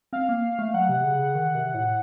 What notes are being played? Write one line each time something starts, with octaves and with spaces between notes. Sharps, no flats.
C4 F5
A#3
A3
F#3 F#5
C3
C#3
C#3
D#3
C3
A2